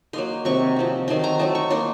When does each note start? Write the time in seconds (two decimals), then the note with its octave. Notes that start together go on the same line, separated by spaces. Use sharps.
0.13 F#3 A#3 D#4 C6
0.45 C3 D#3 F#3 C4 C#6
0.76 F3 C4 D#4
1.08 D#3 F#3 A3 D#4 C6
1.24 A#5
1.39 F#3 A3 D#4 A5
1.55 C#6
1.70 F#3 A#3 D#4 C6